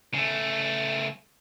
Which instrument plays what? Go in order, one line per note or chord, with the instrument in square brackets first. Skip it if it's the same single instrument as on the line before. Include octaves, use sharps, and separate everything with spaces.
[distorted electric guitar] C#3 A3